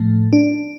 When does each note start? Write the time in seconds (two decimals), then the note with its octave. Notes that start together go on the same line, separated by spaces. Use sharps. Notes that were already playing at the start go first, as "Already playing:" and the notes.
Already playing: A2 F3 A3
0.33 D4